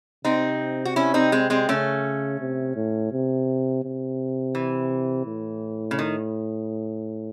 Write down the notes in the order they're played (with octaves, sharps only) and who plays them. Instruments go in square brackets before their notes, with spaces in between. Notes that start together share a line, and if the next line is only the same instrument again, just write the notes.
[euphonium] C3 [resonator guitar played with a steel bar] C4 D#4
[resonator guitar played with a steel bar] F#4
C#4 E4
C4 D#4
G#3 C4
G#3 C4
[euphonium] C#3 [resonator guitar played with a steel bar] A3 C#4
[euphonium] C3
A2
C3
C3
[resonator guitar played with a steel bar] E3
[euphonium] A2
[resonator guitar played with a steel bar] C#3
D#3